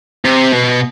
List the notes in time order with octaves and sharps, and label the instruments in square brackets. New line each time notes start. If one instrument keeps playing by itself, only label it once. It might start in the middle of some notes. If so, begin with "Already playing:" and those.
[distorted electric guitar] C3
B2